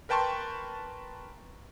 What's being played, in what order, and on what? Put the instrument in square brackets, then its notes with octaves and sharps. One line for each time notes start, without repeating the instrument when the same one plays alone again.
[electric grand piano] A#4 B4 G5 A5 C6 C#6